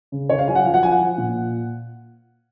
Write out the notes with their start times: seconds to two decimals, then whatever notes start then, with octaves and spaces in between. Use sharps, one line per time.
0.12 C#3
0.29 C#3 C#5
0.39 F5
0.48 F#3 G#5
0.55 F#5
0.65 F3 F5
0.74 F#5
0.83 F3 G#5
0.92 F#5
1.00 F3
1.18 A#2